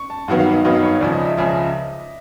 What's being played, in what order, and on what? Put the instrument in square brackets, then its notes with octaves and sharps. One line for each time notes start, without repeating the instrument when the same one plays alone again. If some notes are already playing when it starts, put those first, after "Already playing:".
Already playing: [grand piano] C#6
A5
[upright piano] G2 D#3 F#3 B3 [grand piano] F#5
[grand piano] F5
D#5
[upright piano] G2 D#3 F#3 B3 [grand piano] D#5
[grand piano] C#5
[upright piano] C#2 C#3 F3 [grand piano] D5
[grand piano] D#5
E5
[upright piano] C#2 C#3 F3